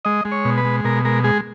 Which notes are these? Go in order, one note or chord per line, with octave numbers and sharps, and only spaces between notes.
G#3 D#5
G#3
C#5
B2
B4
G#3
B2 A#4
G#3 A#4
G#3 G#4